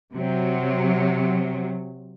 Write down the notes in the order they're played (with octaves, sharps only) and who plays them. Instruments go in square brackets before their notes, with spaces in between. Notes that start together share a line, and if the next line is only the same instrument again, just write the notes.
[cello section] C3 F#3